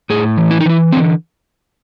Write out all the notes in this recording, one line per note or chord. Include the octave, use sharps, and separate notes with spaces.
A2 G#4
E3
E4
D#4
E3 E4
D3 C4